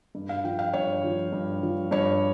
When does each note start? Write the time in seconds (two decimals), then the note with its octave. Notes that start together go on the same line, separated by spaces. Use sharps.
0.15 G2
0.29 F5
0.44 F3 G5
0.59 F5
0.73 G2 C#5
1.04 F3
1.32 G2
1.63 F3
1.91 G2 C#5